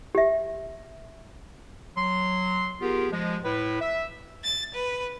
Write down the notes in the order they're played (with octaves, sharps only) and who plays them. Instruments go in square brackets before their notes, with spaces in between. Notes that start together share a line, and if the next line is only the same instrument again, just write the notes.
[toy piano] G4 E5
[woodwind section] F#3 C6
B3 F4 G4 G#4 A#4
F3 G#3
A2 E4 B4
E5
[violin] A6
B4